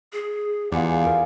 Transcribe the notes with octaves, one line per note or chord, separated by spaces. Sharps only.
G#4
E2 F4 G#4 D5 F#5
A#4